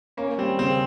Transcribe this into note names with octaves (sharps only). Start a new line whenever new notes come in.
A#3 C#4
G3 C4
C#3 C4